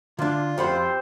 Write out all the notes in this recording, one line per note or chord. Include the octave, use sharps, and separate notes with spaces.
D3 D4 F4
F2 C4 G4 C5 F#5 B5